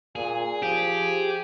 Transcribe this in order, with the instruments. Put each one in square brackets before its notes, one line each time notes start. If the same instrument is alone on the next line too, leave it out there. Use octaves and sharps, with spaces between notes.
[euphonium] A#2 [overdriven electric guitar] G#4
[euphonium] F3 [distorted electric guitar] G4